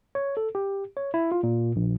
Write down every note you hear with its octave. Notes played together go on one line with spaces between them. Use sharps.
C#5
A4
G4
C#5
E4
F4
A#2
A#1